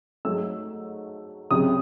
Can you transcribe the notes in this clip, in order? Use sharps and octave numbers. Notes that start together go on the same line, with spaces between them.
G#2 F#3 A3 E6
C#2 C3 F#3 D#6